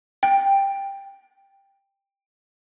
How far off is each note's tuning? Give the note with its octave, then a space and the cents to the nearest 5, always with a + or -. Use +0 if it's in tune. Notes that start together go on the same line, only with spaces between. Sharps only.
G5 +10